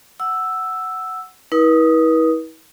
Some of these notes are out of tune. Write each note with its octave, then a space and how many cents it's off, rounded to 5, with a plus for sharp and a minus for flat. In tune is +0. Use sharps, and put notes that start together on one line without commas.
F#5 +0 E6 +0
E4 -40 B4 -40 D#6 +0